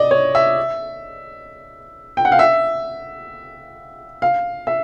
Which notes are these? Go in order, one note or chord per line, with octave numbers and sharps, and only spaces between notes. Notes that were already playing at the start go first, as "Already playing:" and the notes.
Already playing: D5 D#5
C#5
E5
G5
F#5
F5
E5
F5
E5